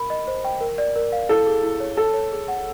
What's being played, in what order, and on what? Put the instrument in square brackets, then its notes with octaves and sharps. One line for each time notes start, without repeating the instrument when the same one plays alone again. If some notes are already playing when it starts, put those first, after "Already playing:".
Already playing: [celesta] A#4 B5
D#5
C5
G5
A#4
D5
A#4
F5
[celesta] E4 [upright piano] A4
[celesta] G#4
E4
C#5
[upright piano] A4 [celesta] A5
[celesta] C#5
G#4
F#5